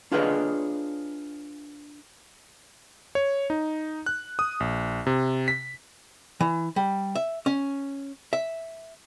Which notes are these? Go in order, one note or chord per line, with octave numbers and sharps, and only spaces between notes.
D4 F4 G#4 B4 C#5 D#5
C#5
D#4
F#6
D#6
A#1
C3
B6
E3
G3
E5
C#4
E5